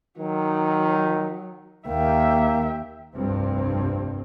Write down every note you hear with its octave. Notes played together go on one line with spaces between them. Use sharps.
D#3 F#3
D#2 A#3 E5 G5
F1 C2 G2 C4